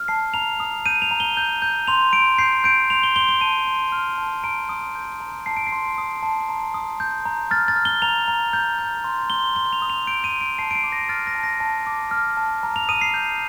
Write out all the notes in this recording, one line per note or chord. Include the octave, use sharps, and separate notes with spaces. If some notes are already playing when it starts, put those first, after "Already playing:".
Already playing: F6
A5 C7
A#5 F7
D#6
G6 D#7
F7
A#5
G7
G6
G6
C6 F7
C6 D7
G6 C7
G6 D7
C6 F7
G7
C6 G7
G7
A5 D#7
C6
F6
A5
A#5 D7
D#6
G6
A#5
A5 C7
D7
C7
C6
D#6
A5
A#5
D#6
G6
A#5
F6 A6
A6
F6
G7
A#5 F7
A#5
G6
G6
C6
C6 G7
C6 G7
F7
D#6
F7
G6 D7
D#7
C6
D7
A5 C7
D7
C7
D6
A#6
F6 A6
A#6
A5
A#6
A5
D6
F6
A5
A#5
F7
D#6 D#7
C7
G6